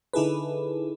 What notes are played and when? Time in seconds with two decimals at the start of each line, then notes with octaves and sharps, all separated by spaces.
0.13 D3 D#4 E4 G#4 A4 B4